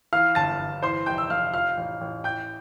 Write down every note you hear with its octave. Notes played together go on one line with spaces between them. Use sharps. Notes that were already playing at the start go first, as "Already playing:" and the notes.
E3 F5 F6
G1 A5 A6
G1
E3 C5 C6
F1 G5 G6
E6
F1 F5 F6
F3 F5 F6
A1
A1
E3 G5 G6